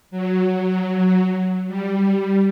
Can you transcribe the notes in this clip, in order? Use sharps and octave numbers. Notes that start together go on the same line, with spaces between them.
F#3
G3